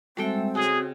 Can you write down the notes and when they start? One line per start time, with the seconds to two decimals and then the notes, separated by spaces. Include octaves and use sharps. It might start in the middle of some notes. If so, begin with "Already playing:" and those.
0.17 G3 G#3 C4 F#4 A4 E5 G5
0.55 C#3 F#4 G#4 D#5